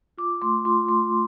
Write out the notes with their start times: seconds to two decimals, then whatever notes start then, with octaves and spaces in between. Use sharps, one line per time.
0.18 F4 D6
0.42 A3 C6
0.65 F4 C6
0.88 A3 C6